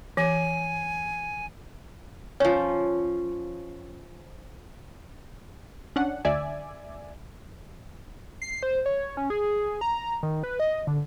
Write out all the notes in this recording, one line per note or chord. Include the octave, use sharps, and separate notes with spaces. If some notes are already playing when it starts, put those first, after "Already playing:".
E3 G#5
F3 C#4 C#5
C#4 D4 F#5
D2 D5 E5 G#5
C7
C5
C#5
C#4
G#4
A#5
D#3
B4
D#5
D3